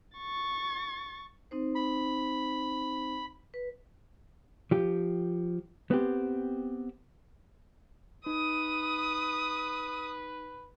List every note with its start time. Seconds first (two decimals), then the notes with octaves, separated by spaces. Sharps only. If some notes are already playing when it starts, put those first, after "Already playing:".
0.18 C#6 A6
1.51 C4 D#4 C5
1.75 B5
3.54 B4
4.71 F3 G4
5.91 B3 C4 G4
8.26 D#4 B4 D#6